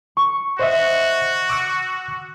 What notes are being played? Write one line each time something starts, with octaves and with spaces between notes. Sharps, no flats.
C#6
F#4 C5 D#5 E5
D6 E6 F#6